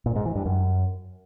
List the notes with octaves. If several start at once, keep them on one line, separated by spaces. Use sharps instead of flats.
A#2
G#2
E3
G2
F#2